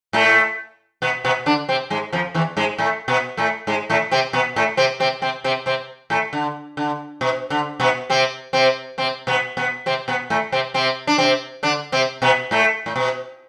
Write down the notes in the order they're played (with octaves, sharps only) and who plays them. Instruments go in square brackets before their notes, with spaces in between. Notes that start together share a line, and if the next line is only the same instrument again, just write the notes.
[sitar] A2 A3
B2 B3
B2 B3
D3 D4
C3 C4
G#2 G#3
F2 F3
E2 E3
G#2 G#3
A2 A3
B2 B3
A2 A3
G#2 G#3
A2 A3
C3 C4
B2 B3
A2 A3
C3 C4
C3 C4
C3 C4
C3 C4
C3 C4
A2 A3
D3
D3
B2
D3
B2 B3
C3 C4
C3 C4
C3 C4
B2 B3
B2 B3
C3 C4
B2 B3
A2 A3
C3 C4
C3 C4
D4
C3 C4
D3 D4
C3 C4
B2 B3
A2 A3
A2
B2